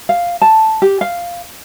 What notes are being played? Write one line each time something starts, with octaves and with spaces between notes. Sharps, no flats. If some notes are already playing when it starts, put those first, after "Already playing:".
F5
A5
G4
F5